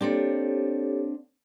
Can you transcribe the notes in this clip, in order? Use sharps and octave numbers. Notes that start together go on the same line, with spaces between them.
A#3 C4 D4 G4 A4 C#5